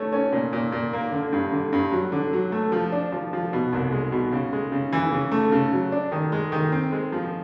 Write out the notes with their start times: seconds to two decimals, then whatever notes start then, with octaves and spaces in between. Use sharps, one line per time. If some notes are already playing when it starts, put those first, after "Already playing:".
Already playing: A3 C#4
0.13 C#4
0.33 A#2
0.53 A#2
0.72 A#2
0.93 A#3
1.12 D3
1.33 G2
1.52 D3
1.73 G2
1.92 F#3
2.12 D3
2.33 F#3
2.52 A3
2.72 F3
2.92 D4
3.12 F3
3.33 F3
3.53 B2
3.73 C2
3.92 G#3
4.12 B2
4.32 C#3
4.52 G#3
4.72 C#3
4.93 E3
5.12 C#3
5.32 A3
5.52 C#3
5.72 F#3
5.92 D4
6.12 D#3
6.32 G#3
6.52 D#3
6.72 C4
6.92 G#3
7.12 F3